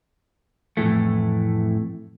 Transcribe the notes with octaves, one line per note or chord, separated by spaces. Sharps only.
F2 A2 E3 A3